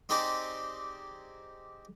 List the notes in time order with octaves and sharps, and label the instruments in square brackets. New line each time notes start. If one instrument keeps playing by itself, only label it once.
[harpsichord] C4 D#4 G4 G#4 C5 D5